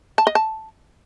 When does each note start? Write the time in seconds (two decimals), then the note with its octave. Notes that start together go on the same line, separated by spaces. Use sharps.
0.18 A5
0.27 D#5
0.35 A5